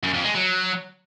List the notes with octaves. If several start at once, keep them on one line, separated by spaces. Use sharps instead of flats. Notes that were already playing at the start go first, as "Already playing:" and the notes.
F#2
F2
G#3
F#3